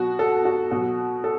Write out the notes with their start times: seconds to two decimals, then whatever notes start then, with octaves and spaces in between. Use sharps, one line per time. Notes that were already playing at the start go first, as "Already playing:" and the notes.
Already playing: B2 F#3 F#4
0.19 A4
0.45 F#4
0.71 B2 F#3 F#4
1.24 A4